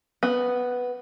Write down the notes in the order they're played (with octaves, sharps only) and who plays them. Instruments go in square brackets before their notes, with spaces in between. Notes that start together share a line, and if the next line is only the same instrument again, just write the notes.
[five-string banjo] B3